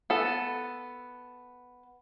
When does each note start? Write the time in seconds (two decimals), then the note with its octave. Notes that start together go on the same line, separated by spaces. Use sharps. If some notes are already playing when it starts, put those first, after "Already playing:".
0.10 B3 A4